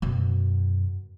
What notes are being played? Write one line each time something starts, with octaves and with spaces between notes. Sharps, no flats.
F#2 B2